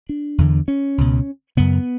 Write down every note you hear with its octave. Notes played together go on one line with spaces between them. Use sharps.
D4
E2 D3
C#4
C#2 B2
F#2 C#3 B3